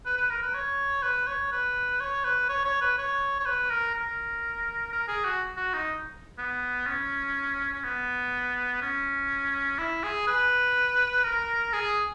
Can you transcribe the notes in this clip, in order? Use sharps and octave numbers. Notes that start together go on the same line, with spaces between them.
B4
B4
A#4
B4
C#5
B4
C#5
B4
C#5
B4
C#5
C#5
B4
C#5
C#5
B4
A#4
A#4
A#4
G#4
F#4
F#4
D#4
B3
C#4
C#4
B3
C#4
E4
G#4
B4
A#4
G#4